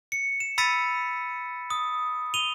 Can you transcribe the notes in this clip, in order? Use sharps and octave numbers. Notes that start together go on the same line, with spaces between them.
C#7
E7
B5 E6 A6 B6 C#7 D#7
D#6
D#7 F7 G7